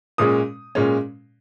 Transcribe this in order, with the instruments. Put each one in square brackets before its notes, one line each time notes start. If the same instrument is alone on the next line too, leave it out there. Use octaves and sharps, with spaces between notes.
[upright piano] A#2 G#3 C#4 D#6
A#2 G#3 C#4